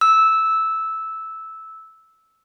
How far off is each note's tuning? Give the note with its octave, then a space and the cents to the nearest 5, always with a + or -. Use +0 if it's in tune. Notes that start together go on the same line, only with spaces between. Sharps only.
E6 -10